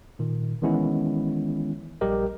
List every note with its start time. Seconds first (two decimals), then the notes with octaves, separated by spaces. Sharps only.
0.19 A#2 D#3
0.62 D#3 E3 G#3 B3 C#4 E4
2.01 A#1 G3 G4 A#4 D#5